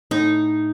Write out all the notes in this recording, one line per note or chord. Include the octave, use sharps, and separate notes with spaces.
A2 D#4